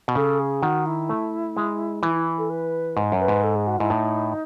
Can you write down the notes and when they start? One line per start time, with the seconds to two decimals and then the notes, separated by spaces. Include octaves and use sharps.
0.08 B2
0.15 C#3 A4
0.39 G#4
0.62 D#3 F#4
0.86 E4
1.09 A3
1.57 G#3
2.03 E3 E4
2.15 E4
2.38 A4
2.50 B4
2.97 G#2
3.12 F#2
3.20 B4
3.28 G#2
3.43 A4
3.55 G#4
3.67 F#4
3.79 G#2 E4
3.90 A2 D#4